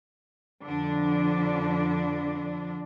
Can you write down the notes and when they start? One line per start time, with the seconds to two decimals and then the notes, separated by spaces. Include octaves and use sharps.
0.65 F2 D3 D4